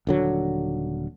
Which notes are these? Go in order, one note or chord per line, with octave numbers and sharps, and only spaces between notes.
D#1 D3 F#3